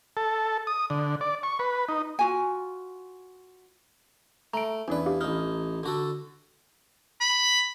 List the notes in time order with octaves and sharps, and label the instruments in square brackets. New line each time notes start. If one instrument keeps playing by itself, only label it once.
[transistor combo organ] A4
D#6
D3
D5
C#6
B4
D#4
[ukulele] F4 F#4 G#5
[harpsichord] A3 [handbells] A#5 D7
[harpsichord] E2 B4 [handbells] C#4 D4 D5
[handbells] D4 G4 F5
[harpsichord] A1 D#4 [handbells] F6
[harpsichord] D3 F#4 A4
[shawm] B5